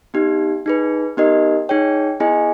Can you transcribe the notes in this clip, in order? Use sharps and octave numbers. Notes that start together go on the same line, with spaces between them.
B3 D#4 G4
D#4 G#4 B4
B3 D#4 G4 A#4 D#5
D#4 G#4 C#5 G5
B3 E4 G#4 D#5 G#5